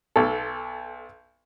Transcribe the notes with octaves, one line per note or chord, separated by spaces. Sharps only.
B1 A4